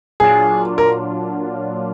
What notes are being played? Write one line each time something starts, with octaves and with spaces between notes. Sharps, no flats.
A#2 F#3 D4 F4 G#4
A#4